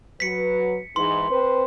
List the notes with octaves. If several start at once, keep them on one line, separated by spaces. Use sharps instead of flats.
F#3 B4 B6 C#7
G#2 E3 C6
C4 B4 C5